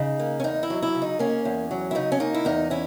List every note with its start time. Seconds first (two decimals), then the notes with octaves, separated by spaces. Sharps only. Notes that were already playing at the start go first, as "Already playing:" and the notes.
Already playing: C#3 D#4
0.20 A#3
0.40 C#4
0.44 E2 D#4
0.63 E4
0.70 F#3
0.82 E4
0.95 C#3
1.02 D#4
1.19 A#3 C#4
1.45 E2
1.71 F#3
1.91 E4
1.95 C#3 D#4
2.12 C#4
2.20 A#3 D#4
2.34 E4
2.45 E2 D#4
2.70 C#4 E4